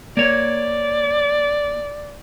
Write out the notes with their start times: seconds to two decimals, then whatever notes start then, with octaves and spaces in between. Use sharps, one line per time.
0.17 A#3 C#5 D5